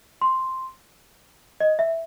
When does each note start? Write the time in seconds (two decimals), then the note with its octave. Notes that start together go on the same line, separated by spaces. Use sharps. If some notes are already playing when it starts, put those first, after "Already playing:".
0.21 C6
1.60 D#5
1.79 E5